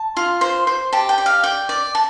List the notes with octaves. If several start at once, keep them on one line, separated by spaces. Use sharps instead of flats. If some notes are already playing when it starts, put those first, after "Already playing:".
Already playing: A5
F4
C5
C5
G4 A5
G5
D5
F5
D5 G5
D5
A5